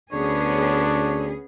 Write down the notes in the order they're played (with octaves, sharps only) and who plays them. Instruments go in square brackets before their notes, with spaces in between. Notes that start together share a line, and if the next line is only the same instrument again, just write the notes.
[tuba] D2 [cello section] B3 C#4 G#4 [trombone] D4 [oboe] C#5